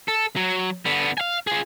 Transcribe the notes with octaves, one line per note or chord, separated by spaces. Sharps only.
A4
F#3
D3 B3
F5 G#5
F4 G#4